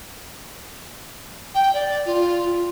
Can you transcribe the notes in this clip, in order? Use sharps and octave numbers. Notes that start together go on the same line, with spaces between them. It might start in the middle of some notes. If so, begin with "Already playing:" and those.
G5
D5
F4